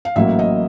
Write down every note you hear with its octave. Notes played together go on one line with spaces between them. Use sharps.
F5
A1 A2 F#3 A#3 E5
D#5